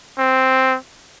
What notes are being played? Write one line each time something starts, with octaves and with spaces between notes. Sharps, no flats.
C4